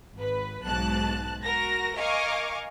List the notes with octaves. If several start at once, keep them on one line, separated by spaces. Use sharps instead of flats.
G#1 B4
B1 G#2 B2 A5 F#6
F#4 A#4 A#6
A#4 D#5 F5 G#5 C#6 D6